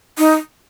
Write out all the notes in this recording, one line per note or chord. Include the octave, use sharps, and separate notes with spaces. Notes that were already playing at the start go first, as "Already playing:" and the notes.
D#4